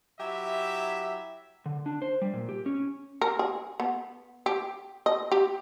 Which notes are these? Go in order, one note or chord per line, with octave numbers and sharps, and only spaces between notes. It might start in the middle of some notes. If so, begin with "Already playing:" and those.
F#3 E4 G4 E5
D3
D4
C5
G3
A#2
G4
C#4
A#4
G#4
B3
G4
D#5
G4